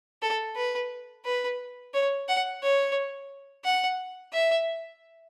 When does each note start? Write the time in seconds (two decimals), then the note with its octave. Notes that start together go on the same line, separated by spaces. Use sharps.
0.22 A4
0.56 B4
1.25 B4
1.94 C#5
2.28 F#5
2.63 C#5
3.64 F#5
4.33 E5